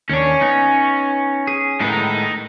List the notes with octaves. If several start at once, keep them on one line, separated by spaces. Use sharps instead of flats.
D#2 C#4 D4 C#5
B3 D#4
G#4
A2 G#3 B3 D#4 A#4